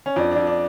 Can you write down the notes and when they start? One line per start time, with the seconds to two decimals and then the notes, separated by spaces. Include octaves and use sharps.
0.06 C#4
0.16 F2 D4
0.32 F2 D4
0.47 D4